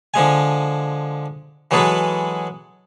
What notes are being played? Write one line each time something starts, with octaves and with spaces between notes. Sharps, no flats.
D3 F3 G#3 G#5
E3 F#3 G#3 G#4 A4 B4